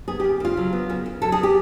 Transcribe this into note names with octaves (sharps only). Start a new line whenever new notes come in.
B3 G#4
G4
C#3
C#3 F4
F#3
B3
C#3
C#3
F#3 A4
G#4
B3
G4